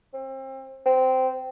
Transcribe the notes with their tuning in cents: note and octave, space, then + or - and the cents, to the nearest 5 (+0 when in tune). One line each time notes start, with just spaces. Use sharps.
C4 +30
C4 -15